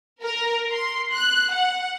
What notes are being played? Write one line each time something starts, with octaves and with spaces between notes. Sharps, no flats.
A#4
C6
F#6
F#5